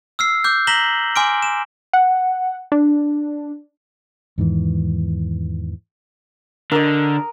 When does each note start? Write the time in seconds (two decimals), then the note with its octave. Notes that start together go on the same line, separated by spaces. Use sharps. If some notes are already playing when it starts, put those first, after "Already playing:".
0.19 E6 F6 C7
0.44 D6 F6 G6
0.67 A#5 A#6 B6 E7 F#7 G7
1.16 G#5 C6 D6 F6 D7
1.42 E7
1.93 F#5
2.72 D4
4.38 E2 G#2 D#3 E3
6.72 D3 A#4 D#5